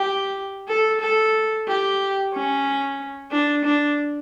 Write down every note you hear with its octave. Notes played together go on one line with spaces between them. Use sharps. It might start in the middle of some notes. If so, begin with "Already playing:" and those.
Already playing: G4
A4
A4
G4
C#4
D4
D4